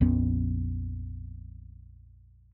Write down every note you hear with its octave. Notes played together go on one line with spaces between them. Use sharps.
A#1 F2 B3 C#4